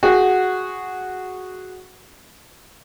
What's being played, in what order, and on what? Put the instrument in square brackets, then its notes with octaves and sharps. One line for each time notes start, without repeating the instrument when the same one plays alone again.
[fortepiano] F#4 G#4